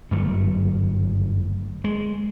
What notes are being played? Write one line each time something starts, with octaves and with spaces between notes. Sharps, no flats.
G1 F#2 A3
G#3